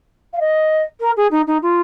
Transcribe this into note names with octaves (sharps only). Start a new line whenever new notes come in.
F5
D#5
A#4
G#4
D#4
D#4
F4